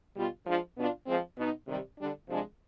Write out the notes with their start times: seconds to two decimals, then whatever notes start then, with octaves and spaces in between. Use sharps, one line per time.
0.15 B2 G3 B3 F4
0.46 F3 G#3 D4 F4
0.76 B2 B3 D4 F4
1.06 F3 G#3 C4
1.37 B2 B3 D#4
1.67 C3 D#3 G3
1.97 D3 G3 D4
2.28 C3 F3 G#3 D4